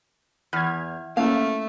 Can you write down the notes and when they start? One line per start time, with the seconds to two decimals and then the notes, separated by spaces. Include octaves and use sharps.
0.53 E2 F6 G#6
1.17 A3 A#3 C#4 E4 F5